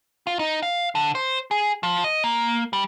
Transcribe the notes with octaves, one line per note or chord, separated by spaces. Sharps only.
F4
D#4
F5
D3
C5
G#4
F3
D#5
A#3
G3